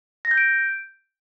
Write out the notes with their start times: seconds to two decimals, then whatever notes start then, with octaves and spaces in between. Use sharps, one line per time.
0.25 A#6
0.31 G6
0.38 D7